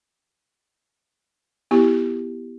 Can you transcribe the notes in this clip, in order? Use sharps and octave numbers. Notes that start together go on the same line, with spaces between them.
B3 E4 G4